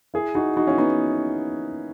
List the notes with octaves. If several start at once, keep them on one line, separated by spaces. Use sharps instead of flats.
E4 G#4
D#4 F#4
D#4 F#4
C#4 E4
B3 D#4